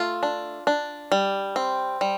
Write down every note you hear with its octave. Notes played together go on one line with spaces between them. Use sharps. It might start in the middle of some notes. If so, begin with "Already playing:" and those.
Already playing: A3 F4
D4
D4
G3
C4
G3